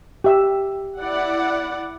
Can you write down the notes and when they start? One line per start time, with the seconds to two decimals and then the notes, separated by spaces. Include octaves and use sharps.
0.24 G4 E5 E6
0.98 E4 D5 F#5